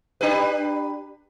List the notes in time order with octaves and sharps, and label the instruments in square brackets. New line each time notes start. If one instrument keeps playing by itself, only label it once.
[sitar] D4 G4 B4